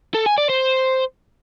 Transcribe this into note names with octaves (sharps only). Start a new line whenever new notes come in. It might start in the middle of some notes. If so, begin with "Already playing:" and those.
A4
G#5
D5
C5